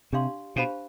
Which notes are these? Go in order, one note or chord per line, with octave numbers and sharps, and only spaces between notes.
C3 D4 G4 D5 F5 C6
B2 D4 G4 C5 F5 B5